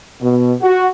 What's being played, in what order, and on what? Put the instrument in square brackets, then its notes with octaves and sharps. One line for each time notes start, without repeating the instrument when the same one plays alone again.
[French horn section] B2
F#4